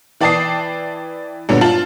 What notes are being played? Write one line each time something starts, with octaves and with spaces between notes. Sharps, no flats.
E3 D5 G5 A5 D#6 C7
G2 A#2 D3 F#3 B3
F4 A5 F#7